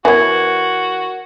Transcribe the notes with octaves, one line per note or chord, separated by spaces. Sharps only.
E3 B3 F#4 A#4 C#5 G#6